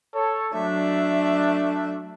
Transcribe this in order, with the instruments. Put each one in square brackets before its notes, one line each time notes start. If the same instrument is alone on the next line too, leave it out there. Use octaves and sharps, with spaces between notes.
[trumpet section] A4 C#5
[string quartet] F#3 E5 [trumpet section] A3 D4